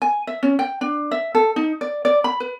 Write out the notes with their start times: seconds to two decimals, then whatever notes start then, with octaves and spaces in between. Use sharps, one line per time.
0.02 G#5
0.27 E5
0.43 C#4
0.59 G5
0.81 D4
1.11 E5
1.35 A4
1.56 D#4
1.81 D5
2.05 D5
2.24 B5
2.40 B4